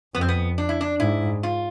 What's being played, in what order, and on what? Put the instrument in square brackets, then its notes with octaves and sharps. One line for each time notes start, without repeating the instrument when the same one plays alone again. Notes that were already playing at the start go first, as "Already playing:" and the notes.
[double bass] F2 [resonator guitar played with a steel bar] B3
[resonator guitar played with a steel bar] C4
B3
D4
E4
D4
[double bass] G#2 [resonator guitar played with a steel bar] E4
[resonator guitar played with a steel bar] F4